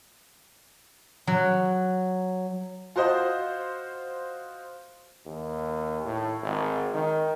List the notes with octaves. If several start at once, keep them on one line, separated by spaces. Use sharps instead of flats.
F#3
F4 F#4 C5 D#5
D#2
A2
G#1
D#3